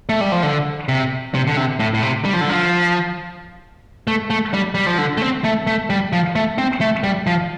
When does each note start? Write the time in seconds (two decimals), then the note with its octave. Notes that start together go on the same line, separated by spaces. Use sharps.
0.09 A3
0.21 G3
0.32 F3
0.43 D3
0.89 C3
1.34 C3
1.47 D3
1.57 C3
1.80 A2
1.94 A2
2.03 C3
2.25 G3
2.33 F3
2.41 D3
2.50 F3
4.07 A3
4.30 A3
4.54 G3
4.75 G3
4.86 F3
4.98 D3
5.17 A3
5.22 C4
5.44 A3
5.67 A3
5.90 G3
6.13 F3
6.36 A3
6.58 C4
6.81 A3
7.04 G3
7.27 F3